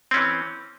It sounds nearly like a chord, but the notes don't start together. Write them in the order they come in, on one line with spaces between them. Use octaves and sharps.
C4 C#4 E3